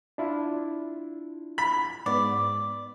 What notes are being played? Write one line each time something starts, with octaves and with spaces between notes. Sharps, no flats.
D4 E4 F4
B5
G#2 B3 D5